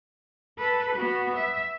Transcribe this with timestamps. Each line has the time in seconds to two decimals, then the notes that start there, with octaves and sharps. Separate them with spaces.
0.58 A4 B4
0.96 B3 F#4
1.36 E5